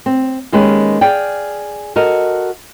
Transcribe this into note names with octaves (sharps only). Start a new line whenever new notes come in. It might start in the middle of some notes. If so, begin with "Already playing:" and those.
C4
D#2 D#3 G#3 C#4 G4 B4
G#4 D5 F5 G5
F#4 A4 A#4 D#5 F5